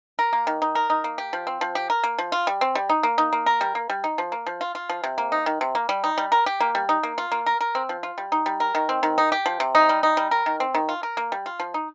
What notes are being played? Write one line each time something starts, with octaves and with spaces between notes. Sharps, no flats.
A#4
A#3
D#3
D#4
A#4
D#4
A#3
G4
F3
C4
F3
G4
A#4
A#3
F3
F4
G3
C4
G3
D#4
A#3
D#4
A#3
A#4
G3
A#3
G3
D#4
F3
A#3
F3
F4
F4
F3
C3
A#3
D#4
D#3
C3
A#3
G3
D#4
G3
A#4
G4
A#3
G3
D#4
A#3
F4
A#3
A#4
A#4
C4
F3
F4
G3
D#4
G3
A#4
D#3
C4
D#3
D#4
G4
F3
C3
D#4
G3
D#4
G3
A#4
D#3
C4
D#3
F4
A#4
A#3
G3
F4
F3
D#4